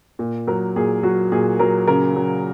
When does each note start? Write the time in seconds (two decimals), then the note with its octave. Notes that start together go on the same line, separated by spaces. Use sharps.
0.19 A#2
0.47 F#3 A#4
0.76 A#2 G#4
1.03 F#3 F#4
1.32 A#2 G#4
1.59 F#3 A#4
1.87 C#3 A#4
2.16 F#3